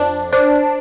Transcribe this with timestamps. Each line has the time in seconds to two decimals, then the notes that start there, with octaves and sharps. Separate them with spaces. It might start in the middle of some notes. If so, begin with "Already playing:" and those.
Already playing: F2 D4 C5
0.33 D4 C5